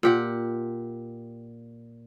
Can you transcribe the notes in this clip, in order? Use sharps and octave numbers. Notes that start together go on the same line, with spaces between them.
A#2 G4 F#5